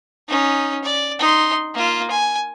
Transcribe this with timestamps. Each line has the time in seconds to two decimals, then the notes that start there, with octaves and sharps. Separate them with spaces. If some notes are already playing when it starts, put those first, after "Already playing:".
0.28 C#4 D#4
0.84 D5
1.19 D#4 C6
1.74 A#3 F4
2.11 G#5